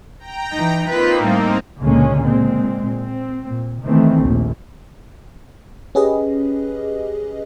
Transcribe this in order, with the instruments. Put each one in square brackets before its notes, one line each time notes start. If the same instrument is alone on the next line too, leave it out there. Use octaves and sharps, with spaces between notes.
[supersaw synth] G5 A#5
[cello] E3 D#4
[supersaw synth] A#3 C4 D#4 [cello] F4 B4
[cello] A2 G3
[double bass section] C#2 A#2 D3 G#3 A#3 C#4
A#2 G#3 C4
C4
A#2
D#3 E3 A3 C4
A#1 D#2 A#2
[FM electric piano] C#4 G4 G#4 B4 D#5